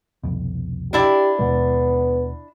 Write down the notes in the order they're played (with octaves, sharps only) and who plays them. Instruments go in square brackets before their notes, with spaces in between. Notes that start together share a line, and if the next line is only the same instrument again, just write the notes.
[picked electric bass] C2 F2 B2
[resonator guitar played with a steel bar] D4 E4 D5 [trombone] G4
[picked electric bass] D#2 B2 G#3 [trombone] B3